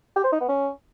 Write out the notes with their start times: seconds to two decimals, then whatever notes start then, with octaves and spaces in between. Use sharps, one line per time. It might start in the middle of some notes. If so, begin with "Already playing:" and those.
0.16 G4
0.24 C5
0.32 D#4
0.41 B3
0.49 C#4